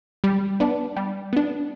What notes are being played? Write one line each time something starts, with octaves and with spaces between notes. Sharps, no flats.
G3
B3 D4
G3
B3 D4